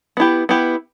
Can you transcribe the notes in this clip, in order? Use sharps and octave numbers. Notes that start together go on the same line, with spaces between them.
B3 E4 G4
B3 E4 G4